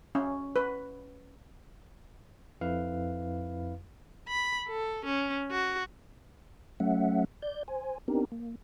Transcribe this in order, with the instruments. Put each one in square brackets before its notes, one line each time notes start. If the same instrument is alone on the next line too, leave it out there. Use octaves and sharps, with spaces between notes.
[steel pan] C#4
B4
[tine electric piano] F2 E4 B4 F5
[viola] B5
A4
C#4
F#4
[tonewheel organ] F#3 A3 C#4 E5 F#5
D5 G6
C5 G#5
B3 C4 D4 D#4 G4 A#4
A#3